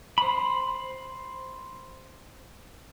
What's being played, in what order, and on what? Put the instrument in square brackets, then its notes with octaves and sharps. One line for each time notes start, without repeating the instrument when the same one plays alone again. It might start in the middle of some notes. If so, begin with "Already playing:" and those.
[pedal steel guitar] C5 B5